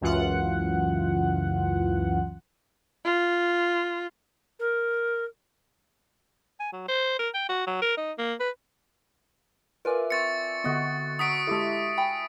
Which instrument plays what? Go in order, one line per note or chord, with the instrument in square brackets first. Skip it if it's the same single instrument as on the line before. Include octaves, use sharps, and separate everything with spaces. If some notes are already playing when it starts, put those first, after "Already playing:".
[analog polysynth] C#2 F#2 E3 F4 F#5
[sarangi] F4
[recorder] A#4
[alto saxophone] G#5
F#3
C5
A#4
G5
F#4
F#3
A#4
D#4
A#3
B4
[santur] F4 D5 E5 [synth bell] A#4 B4 G#5
[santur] C4 [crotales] C#6 A6 C#7
[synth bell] D3 B3 [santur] F#4 D#5
[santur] F#3 [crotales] D#6 B6 D7
[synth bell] G#3 G4 A4 [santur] A3 E4
[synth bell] G5 G#5 [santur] B5